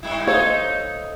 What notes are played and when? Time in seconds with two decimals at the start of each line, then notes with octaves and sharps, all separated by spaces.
0.03 G2 E4
0.27 D#4 A4 C5 C#5 F5